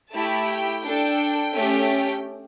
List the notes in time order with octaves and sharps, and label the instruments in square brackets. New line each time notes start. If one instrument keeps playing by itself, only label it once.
[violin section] A3 E4 G4 A5
G5
D4 A4 G5
A3 C#4 G4